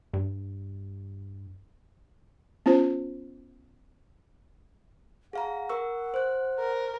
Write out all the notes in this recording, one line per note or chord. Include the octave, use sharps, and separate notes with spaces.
G2
B3 C#4 F4 C5
G#4 F5 F#5 A#5
A#4 C#6 E6
C5 F#6
A#4